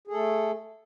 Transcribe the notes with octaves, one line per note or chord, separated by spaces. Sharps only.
A3 G#4 A4